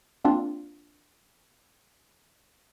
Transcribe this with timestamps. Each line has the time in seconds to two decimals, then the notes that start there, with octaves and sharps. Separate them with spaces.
0.24 A#3 C4 D4 F4